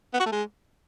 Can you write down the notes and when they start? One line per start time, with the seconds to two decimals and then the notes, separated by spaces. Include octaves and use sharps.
0.14 B3
0.20 F#4
0.26 A3
0.32 G#3